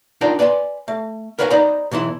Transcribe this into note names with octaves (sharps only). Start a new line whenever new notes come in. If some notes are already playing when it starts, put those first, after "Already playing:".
D4 D#4 F4 A#4 D5 G5
B4 D5 G#5 B5 C6
A3
A#4 B4 C#5 F5 G5 G#5
D#4 C5 D5 D#5 A#5 B5
B1 E3 E4 C6